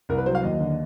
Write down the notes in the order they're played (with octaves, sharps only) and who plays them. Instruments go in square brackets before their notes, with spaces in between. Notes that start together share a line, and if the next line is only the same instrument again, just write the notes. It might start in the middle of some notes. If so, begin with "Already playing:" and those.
[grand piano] C2 A#4
B4
F#3 C5
F5
D#2 D#5
D3